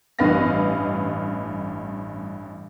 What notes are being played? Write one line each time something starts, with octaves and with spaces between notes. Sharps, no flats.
A1 G2 B4 D#5 F5 A#6